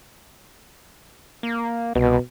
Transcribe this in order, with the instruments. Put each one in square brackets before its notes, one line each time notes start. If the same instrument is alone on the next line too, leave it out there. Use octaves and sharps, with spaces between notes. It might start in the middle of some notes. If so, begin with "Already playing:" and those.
[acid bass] A#3
[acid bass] C2 [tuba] B2